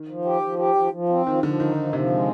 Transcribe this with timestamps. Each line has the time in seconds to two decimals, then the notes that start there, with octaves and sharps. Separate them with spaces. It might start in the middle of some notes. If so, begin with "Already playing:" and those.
Already playing: D#3
0.08 F3
0.25 G4
0.42 F3
0.58 G4
0.75 F3
0.93 F3
1.09 C4
1.26 D#3 F3
1.43 D3 F3
1.60 D#3 D#4
1.77 F3
1.93 C3 F3
2.10 G#3